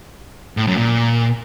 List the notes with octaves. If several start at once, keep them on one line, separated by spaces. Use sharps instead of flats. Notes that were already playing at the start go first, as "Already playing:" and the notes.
A2
F#2
A#2